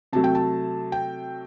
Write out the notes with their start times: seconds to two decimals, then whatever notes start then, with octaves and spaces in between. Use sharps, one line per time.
0.13 C3 F#3 A3 A5
0.24 G5
0.35 A5
0.92 G5